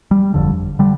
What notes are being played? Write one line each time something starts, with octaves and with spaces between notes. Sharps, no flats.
G3
G1 F2 D3
D3 G3